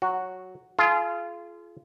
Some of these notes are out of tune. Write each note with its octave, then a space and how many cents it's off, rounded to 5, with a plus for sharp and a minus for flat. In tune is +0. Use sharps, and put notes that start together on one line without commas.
F#3 +0 F#4 +0
F4 -20 G#4 +35